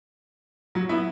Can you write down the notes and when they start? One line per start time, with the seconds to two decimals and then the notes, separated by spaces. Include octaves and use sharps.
0.75 F#3
0.89 B3 E4